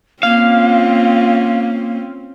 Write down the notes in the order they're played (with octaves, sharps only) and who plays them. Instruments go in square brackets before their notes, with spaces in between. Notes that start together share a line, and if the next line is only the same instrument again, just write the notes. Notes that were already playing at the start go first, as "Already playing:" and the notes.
[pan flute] A#3 [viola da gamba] C4 C#4 F4 [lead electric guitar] F5